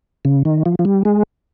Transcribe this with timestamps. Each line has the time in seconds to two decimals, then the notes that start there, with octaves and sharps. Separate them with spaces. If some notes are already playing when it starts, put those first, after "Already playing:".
0.25 C#3
0.45 D#3
0.66 F3
0.79 F3
0.85 G3
1.05 G#3